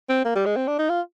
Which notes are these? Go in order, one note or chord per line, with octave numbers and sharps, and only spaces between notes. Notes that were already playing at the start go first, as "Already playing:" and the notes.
C4
A#3
G3
G#3
C4
D4
D#4
F4